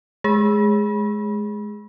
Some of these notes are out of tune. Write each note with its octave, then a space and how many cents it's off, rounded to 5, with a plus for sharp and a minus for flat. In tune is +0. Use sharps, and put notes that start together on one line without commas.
G#3 +25 G#4 -15